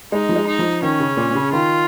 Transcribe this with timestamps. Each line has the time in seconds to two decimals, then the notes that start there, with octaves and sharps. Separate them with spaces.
0.12 G#3 D#4
0.29 F3
0.36 G#3
0.47 D#4
0.59 F3
0.83 D#3 C#4
1.00 C#3
1.17 A#2
1.30 A#2
1.35 C#3
1.53 D#3 F4